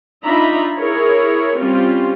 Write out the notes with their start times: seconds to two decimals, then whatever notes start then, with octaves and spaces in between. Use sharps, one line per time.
0.24 D4 D#4 F4 E5 A#5 B5
0.78 E4 G#4 A#4 C#5
1.60 G3 C4 C#4 F4